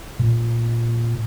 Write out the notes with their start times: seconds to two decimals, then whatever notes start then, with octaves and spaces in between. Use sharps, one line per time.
0.19 A#2